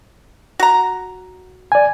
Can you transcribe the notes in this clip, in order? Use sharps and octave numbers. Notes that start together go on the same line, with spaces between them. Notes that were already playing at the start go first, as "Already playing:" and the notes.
F#4 A#5
D5 G#5